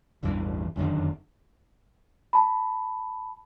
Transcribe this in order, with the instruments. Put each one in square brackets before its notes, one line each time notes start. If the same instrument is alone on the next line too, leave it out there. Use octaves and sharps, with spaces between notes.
[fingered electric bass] E1 A1 G2 E3
F1 F#2 D3 D#3
[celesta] A5 B5